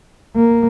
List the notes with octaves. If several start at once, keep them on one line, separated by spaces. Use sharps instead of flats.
A#3